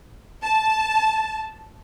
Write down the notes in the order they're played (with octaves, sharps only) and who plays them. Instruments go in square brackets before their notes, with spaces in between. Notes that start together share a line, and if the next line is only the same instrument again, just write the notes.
[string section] A5